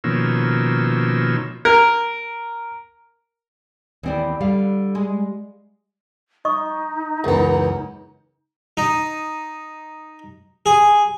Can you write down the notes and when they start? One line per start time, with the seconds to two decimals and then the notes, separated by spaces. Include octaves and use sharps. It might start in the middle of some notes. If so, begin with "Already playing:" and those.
0.04 B2 D#3 F3 A#3 C#4 E6
1.65 A#4
4.03 D#2 E3 B3 C4 D5
4.41 D3 G3 F5
4.95 G#3
6.45 D#4 D#5 C#6 D#6
7.24 C#2 F#2 E3 B3
8.77 D#4
10.66 G#4